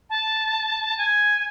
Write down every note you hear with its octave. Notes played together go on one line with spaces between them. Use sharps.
A5
G#5